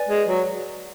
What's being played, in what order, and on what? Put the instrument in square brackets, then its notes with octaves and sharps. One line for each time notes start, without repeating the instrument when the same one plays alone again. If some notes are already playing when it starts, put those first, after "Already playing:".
Already playing: [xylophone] B4 D5 G#5
[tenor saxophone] G#3
F#3